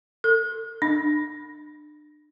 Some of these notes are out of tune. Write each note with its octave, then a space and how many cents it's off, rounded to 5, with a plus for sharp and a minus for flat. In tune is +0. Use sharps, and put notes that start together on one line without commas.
A4 +40
D4 +35